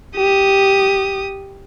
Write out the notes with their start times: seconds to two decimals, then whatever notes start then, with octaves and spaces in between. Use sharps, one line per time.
0.16 G4 D#6